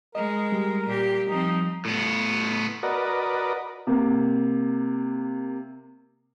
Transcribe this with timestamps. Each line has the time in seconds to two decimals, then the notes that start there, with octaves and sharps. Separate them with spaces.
0.15 G#3 A#4 D#5
0.52 G3
0.86 A#2 G4
1.28 F3 C4 D#4
1.85 A2 B3
2.83 F#4 A#4 B4 D5 D#5
3.87 C3 A#3